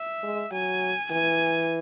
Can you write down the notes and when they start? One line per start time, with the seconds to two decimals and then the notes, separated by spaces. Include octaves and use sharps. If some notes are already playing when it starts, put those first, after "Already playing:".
Already playing: E5
0.23 G#3
0.52 F#3 G#5
1.11 E3 G#5